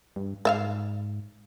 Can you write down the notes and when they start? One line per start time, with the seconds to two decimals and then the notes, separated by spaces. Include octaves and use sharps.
0.16 G2
0.45 G#2 D5 E5 F5